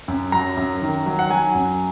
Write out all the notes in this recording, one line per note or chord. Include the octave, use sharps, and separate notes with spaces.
F#2
F#3 A#5
F#2
D#3
F#3
F#5
F#3 G#5
F#2